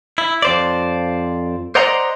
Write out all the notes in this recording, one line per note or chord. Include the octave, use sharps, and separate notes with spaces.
E4
F2 C5 D5
C5 D5 D#5 F#5 A#5 C6